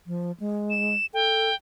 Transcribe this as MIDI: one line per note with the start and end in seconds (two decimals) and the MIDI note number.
0.07 0.32 53
0.40 0.95 56
0.70 1.06 100
1.14 1.50 69
1.14 1.55 79